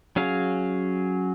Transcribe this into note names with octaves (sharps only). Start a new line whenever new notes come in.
F#3 C#4 G#4 F5